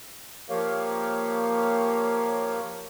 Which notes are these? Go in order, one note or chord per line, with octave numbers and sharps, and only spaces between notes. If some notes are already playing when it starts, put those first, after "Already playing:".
F3 A#3 G4 A#4 C#5 F5